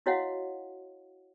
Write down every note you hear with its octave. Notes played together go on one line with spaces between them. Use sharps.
E4 F#4 C#5 D#5 F5 F#5